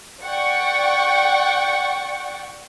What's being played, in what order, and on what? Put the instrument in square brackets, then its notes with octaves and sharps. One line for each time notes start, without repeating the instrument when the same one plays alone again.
[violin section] D5 F#5 G5 C#6